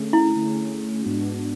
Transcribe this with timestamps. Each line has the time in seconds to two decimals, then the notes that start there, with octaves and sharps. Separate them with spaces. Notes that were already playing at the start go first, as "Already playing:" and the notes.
Already playing: D3 A3 C#4 G#4
0.13 E4
0.36 D3 A3 C#4 G#4
1.02 G#2 G#3 B3 D4 F#4